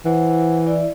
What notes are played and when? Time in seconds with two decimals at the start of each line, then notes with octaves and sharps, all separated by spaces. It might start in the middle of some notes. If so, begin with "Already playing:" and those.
0.05 E3 C5 F#5
0.66 E4 D5 E5